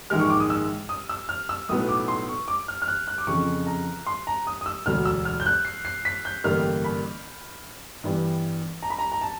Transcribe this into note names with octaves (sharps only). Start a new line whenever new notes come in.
A#1 G#2 D#3 G#3 F6
C#6
D6
D#6
E6
D#6
E6
F6
E6
B1 A2 F#3 B3 D#6
D6
C6
C#6
D6
F6
F6
F#6
F#6
D6
F2 C#3 F3 C#6
A#5
C6
A#5
D#6
D#6
E6
E1 D2 D3 F#3 F6
E6
F6
G6
F#6
C7
C7
B6
G6
A1 G2 D3 G3 A#3 F6
B5
G2 E3 G3 B3
A#5
B5
A#5
A#5
A5